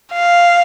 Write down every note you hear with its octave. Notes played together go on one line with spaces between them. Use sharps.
F5